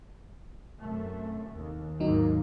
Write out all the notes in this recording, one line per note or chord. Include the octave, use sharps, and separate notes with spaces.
F#2 C3 A3
D#2
D#2 G#2 F#3 A#3 D#4